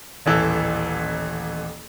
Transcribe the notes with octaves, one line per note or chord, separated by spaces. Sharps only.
D#1 A1 E3 A4 E6